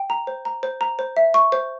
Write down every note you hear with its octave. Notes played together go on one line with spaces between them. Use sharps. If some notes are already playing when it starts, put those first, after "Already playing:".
Already playing: G5
A#5
C5
A#5
C5
A#5
C5
E5
C#6
C5